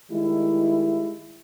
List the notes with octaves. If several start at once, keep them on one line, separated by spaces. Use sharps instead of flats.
D#3 G3 G#3 E4